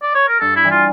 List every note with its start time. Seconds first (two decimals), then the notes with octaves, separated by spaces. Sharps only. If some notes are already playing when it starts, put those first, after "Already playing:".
0.02 D5
0.15 C#5
0.28 A#4
0.40 G2 A4
0.56 E4
0.64 E3 G3
0.71 F4